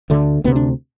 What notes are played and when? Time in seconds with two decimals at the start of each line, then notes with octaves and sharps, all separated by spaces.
0.10 D2 D3 A3
0.44 D2 C3 B3
0.56 D4